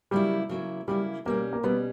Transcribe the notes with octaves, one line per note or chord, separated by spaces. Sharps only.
C#3 F#3 G3 A#3 E4
C#3 F#3 A#3 E4
C#3 F#3 G3 A#3 E4
B2 G3 A#3 C#4
A#3
B2 G3 B3 C#4